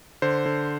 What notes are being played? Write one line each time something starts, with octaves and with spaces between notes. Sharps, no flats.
D3 C5
D3